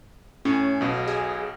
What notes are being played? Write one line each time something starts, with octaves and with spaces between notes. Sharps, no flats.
A2 C#4
B1 B2
G#4